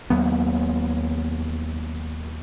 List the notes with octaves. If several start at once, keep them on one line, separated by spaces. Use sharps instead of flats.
D#2 F#3 A#3 B3